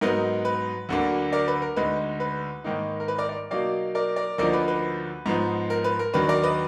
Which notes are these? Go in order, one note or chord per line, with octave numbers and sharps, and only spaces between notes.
G#2 F#3 B3 D#4 A#4
B4
D2 D3 F#3 A#3 D4
A#4 D5
B4
A#4
D2 D3 G#3 D#4 B4
B4
G#2 D#3 A#3 D#4
A#4
B4
A#4 D5
A#4 D5
B2 F#3 A#3 D#4 D5 F5
A#4 D5
A#4 D5
D2 D3 F3 A#3 D#4 A#4 D5
B4
B4
G#2 F3 B3 D#4
A#4
B4
A#4
D#2 D#3 F#3 D4 B4
A#4 D5
B4 D#5